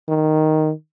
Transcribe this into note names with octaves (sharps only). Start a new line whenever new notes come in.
D#3